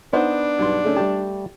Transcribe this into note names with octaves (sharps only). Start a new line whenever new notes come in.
B3 D4 D#4 C5 F#5
B1 G2 C6
C#3 A3 C#4
G3 A3 G4 A5